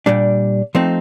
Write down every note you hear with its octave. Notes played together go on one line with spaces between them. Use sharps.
A#2 G3 D4
F3 A3 C4 D#4